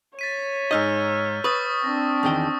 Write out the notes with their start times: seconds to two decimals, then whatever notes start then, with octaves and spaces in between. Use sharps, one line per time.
0.19 C#5 A6 B6 D#7
0.71 G#2 D#4 D#5 E6 F6 G6
1.44 B4 C#6 D#6 A6
1.84 C4 D4 A#6
2.23 E2 D#3 G5 D#6